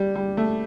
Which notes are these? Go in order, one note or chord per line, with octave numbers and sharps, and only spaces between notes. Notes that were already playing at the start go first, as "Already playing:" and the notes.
Already playing: G3
G3
A3